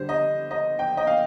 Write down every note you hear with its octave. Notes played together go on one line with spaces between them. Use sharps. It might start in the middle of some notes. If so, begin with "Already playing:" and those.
Already playing: D3 G3 C5
D#5
D#5
G5
D#5
F5